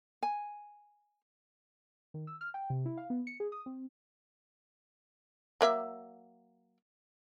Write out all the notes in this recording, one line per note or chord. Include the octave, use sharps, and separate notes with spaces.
G#5
D#3
E6
F6
G5
C3
E4
F5
B3
C#7
G#4
D#6
C4
F#3 A#3 E5